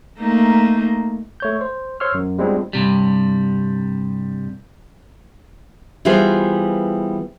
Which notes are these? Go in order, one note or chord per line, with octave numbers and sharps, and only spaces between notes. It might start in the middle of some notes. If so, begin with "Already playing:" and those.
A3 A#3 D#4
A3 C#5 G6
C5
C5 C#5 C6 C#6 E6 F6
F#2
G3 G#3 B3 C4 D4 F4
G2 C3 G3
E3 G3 B3 F4 G#4 C5